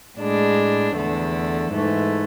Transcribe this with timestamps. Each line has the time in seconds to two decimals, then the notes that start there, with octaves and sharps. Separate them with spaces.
0.18 A2 G#3 D4
0.96 E2 D3 A3
1.73 G#2 E3 A3